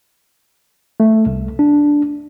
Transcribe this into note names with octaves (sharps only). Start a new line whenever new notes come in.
A3
C2
D4